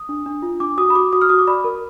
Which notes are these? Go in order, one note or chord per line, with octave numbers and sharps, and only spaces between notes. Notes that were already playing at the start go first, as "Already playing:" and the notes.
Already playing: D#6
D4
D4
F4
D4 D6
F#4 D#6
B5
F#4 D6
F#4 D#6
F6
F#4 D#6
D6
D5 B5
A#4